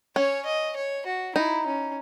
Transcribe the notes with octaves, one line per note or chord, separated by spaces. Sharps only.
C#4 C#5
D#5
C#5
F#4
D#4 E4
C#4